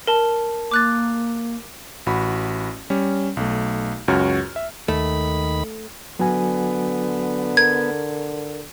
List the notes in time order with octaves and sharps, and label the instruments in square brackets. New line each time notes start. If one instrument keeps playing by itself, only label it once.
[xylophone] A#4 A5
[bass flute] A#3 [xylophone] D6 F#6 A6
[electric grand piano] A1 F#4 B5
G3 C#4
B1 A3
C#2 F#2 F#4 C#5 F6
E5
[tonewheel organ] D#2 D#3 B5 [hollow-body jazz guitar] A3
[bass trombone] D3 [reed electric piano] F#3 F#4 G#5 [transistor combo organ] B3
[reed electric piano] A#4 [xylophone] G#6